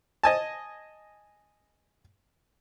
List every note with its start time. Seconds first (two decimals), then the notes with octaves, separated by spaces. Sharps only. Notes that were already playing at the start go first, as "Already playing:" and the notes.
0.23 D#5 G#5 A5